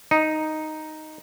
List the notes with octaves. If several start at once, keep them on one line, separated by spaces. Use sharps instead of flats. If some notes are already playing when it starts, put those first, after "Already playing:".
D#4